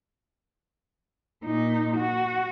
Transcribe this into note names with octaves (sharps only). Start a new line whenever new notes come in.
A#2 D#4
F#4